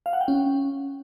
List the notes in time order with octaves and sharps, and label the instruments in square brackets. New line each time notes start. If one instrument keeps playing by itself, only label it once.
[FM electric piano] F5
F#5
G5
C#4